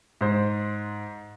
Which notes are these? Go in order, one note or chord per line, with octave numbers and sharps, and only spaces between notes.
G#2 C5